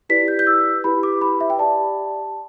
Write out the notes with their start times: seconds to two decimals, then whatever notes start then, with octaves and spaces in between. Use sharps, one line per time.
0.09 E4 G4 B4 D5 B6
0.28 G6
0.39 G6
0.47 E6
0.84 E4 G4 B4 B5
1.03 D6
1.21 B5
1.41 E5
1.50 G5
1.59 G4 D5 A5